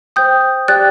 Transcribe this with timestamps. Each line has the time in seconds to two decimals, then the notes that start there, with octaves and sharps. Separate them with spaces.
0.16 C5 G5 D#6 G6
0.68 G4 D5 G5 F#6 A6